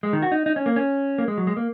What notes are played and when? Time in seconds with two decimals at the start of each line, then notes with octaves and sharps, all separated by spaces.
0.03 G#3
0.13 D#3
0.22 F#4
0.32 D#4
0.46 D#4
0.56 C#4
0.66 A#3
0.76 C#4
1.18 A#3
1.28 G#3
1.38 F#3
1.47 G#3
1.57 A#3